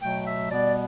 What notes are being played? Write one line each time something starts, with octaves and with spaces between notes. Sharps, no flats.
B2 F#3 A3 G5
E5
B2 G3 B3 D5